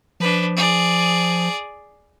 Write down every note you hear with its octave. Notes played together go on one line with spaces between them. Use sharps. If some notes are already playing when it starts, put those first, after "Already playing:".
F3 D4 B4
G#4 D5